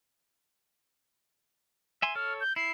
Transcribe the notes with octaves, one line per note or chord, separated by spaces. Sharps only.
E5 G#5 C6
A4 C#5 F6
G6
E4 C7